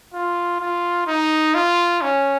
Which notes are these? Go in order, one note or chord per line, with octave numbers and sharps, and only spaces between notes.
F4
F4
D#4
F4
C#4